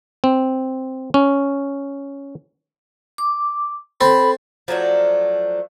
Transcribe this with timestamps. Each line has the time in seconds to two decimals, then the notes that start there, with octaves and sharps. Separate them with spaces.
0.24 C4
1.14 C#4
3.18 D6
4.01 C4 A4 B5
4.68 F3 F#3 A3 D4